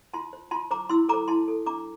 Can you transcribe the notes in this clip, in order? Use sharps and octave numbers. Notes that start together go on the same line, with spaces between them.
F4 A5 C6
C5
F4 A5 C6
C5 A#5 D6
E4 C6 E6
A4 C5 A#5 D6
E4 A5 C6
A4 C5
D4 A#5 D6